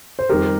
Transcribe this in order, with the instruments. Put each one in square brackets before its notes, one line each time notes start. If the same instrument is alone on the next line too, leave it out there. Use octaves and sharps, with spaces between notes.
[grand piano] C5
F2 D#3 G3 G4 A#4